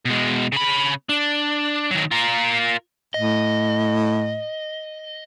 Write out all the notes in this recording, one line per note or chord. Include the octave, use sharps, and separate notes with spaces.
B2 G#3
C#3 B5
D4
D#3 F#3
F4 A#4
A2 D#5